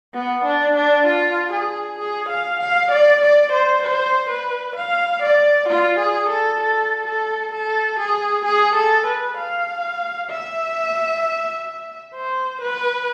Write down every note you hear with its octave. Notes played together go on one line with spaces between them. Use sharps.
B3
D4
D4
F4
G#4
G#4
F5
F5
D5
D5
C5
C5
B4
F5
D5
F4
G#4
A4
A4
A4
A4
G#4
G#4
A4
B4
F5
E5
C5
B4